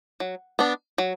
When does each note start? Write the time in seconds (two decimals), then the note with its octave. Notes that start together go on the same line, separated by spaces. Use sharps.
0.20 F#3
0.59 B3 D4
0.98 F#3